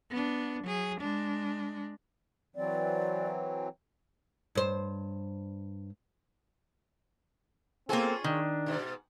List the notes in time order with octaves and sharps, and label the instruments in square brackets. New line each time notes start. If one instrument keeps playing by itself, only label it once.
[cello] B3 D4
F#3 G#4
G#3 D4
[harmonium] E3 F#3 C4 [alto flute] D5
[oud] G2 C5
[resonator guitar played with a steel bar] A#3 A4 [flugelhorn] C4 [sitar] C#4 F4 G#4
[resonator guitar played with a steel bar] D#3 [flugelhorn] D4
[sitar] G#2 B2